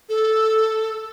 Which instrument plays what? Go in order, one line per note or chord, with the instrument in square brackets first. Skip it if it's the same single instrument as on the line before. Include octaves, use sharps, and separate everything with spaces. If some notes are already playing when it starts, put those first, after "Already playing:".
[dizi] A4